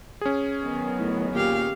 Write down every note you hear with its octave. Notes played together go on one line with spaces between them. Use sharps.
C#4 G#4
D#3 F#3 B3
A2
A#2 G4 F5